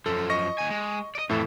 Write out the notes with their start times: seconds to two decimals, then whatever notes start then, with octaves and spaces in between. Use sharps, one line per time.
0.06 F#2 F3 A4
0.30 D#5 C#6 A#6
0.58 D#2 G#5
0.70 G#3
1.15 D5 D#5
1.30 F2 A2 E3 E4 A4